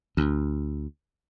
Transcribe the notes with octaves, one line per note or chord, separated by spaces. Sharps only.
D2